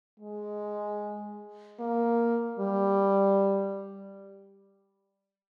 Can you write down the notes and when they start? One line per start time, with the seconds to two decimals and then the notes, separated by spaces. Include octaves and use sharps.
0.20 G#3
1.80 A#3
2.59 G3